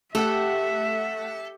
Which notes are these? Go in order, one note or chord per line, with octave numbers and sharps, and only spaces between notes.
A3 G4 A4 E5 F#5